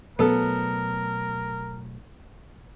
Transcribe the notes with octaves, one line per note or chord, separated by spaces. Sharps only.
B2 F#3 A3 B3 A4 A#4